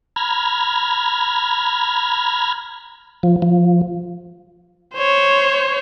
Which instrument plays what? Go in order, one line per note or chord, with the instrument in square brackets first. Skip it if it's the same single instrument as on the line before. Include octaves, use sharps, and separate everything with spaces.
[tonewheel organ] A#5 B5 F6 G#6
F3
F3
[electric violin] C5 C#5